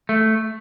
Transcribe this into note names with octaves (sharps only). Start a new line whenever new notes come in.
A3